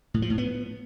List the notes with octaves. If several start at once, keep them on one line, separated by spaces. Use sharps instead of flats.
A2
F3
A2
B3